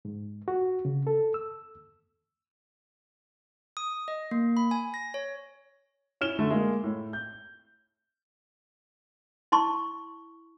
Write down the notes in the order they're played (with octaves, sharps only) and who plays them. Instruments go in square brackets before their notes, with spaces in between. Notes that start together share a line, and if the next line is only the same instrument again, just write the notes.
[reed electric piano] G#2
F#4
C#3
A4
E6
[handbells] D#6
D#5
A#3
B5
G#5
A#6
C#5
[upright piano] C#4 E4 F6 E7 G7
D3 A3
G#3 A#3
A2
G6
[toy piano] E4 A5 C6 C#6